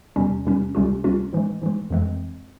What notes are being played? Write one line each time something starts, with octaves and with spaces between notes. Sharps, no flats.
E2 C3 G3 C#4
E2 C3 G3 C#4
C#2 C3 G3 C#4 F4
C#2 C3 G3 C#4 F4
G#2 E3 G#3
G#2 E3 G#3
F2 E3 G#3 C4